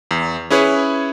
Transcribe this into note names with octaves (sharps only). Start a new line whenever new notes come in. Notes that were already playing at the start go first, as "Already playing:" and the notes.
E2
C#4 E4 G#4 B4 C#5